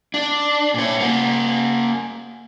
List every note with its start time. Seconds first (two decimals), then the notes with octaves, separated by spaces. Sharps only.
0.14 D4
0.74 A#2 C#5
1.00 A#3 F#4